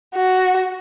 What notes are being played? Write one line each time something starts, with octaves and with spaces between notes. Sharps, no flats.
F#4